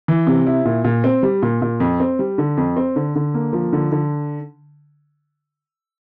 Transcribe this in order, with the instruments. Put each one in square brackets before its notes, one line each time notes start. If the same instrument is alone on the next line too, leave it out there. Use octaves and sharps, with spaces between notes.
[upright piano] E3
C3
E4
A#2
A#2
C4
G3
A#2
A#2
F2
C4
G3
D3
F2
C4
D3
D3
A#3
F3
D3
D3